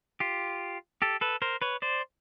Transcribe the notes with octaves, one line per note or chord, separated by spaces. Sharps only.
F4 G4
G4 A4
A4 B4
A#4 C5
B4 C#5
C5 D5